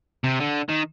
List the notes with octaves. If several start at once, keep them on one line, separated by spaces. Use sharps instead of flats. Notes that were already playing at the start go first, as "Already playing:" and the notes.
C3
D3
D#3